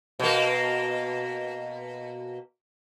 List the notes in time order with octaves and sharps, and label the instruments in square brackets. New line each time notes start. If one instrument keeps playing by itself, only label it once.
[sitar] B2 A#3